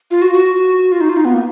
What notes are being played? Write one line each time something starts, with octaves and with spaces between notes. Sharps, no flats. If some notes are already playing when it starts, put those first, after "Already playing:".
F4
F#4
F#4
F4
D#4
F4
D#4
B3
A#3